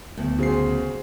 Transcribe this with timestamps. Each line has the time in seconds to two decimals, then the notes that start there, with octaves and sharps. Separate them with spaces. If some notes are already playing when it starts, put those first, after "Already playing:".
0.17 D2 A3 B3
0.39 C#3 F#4 G#4 C5 C7